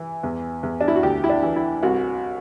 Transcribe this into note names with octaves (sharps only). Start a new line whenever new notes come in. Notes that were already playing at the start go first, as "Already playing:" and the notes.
Already playing: E3
E2
E2
D4
E4
F#4
D2 G4
E4
D4
E3
E4
C2 F#4